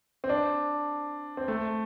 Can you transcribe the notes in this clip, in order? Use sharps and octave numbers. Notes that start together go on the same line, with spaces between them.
C4
D4
C4
A3